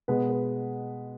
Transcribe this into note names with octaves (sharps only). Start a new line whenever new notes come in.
B2 G#3 B3 B4
B4